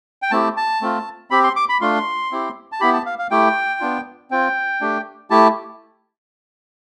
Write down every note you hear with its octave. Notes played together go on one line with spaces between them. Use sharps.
G5
A3 C4 E4 G4 A5
A5
A3 C4 F4
C4 G4 B5
C6
D6
B5
A3 D4 F4 C6
C4 E4 G4
A5
B3 E4 G4 B5
A5
F5
F5
A3 E4 G4 G5
B3 D4 F4
C4 F4 G5
A3 D4 G4
A3 E4 G4 A5